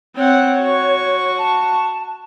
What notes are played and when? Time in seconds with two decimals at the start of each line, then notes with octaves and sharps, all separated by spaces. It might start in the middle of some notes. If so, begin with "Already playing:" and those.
0.16 C4 C#5 F#5
0.60 F#4 C#6
1.38 A5